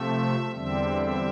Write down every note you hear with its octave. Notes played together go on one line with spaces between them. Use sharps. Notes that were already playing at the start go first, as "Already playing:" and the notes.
Already playing: C3 F3 A3 E5
E2 D3 G3 C4 E5
E5